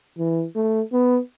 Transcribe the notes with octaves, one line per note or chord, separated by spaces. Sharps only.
E3
A3
B3